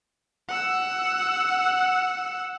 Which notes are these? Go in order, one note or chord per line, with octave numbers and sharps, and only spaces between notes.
F#5 E6